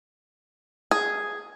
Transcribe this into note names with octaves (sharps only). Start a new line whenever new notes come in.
G#4